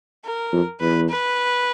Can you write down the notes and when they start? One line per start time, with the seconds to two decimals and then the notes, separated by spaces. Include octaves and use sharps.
0.25 A#4
0.52 F2
0.81 E2 B4
1.09 B4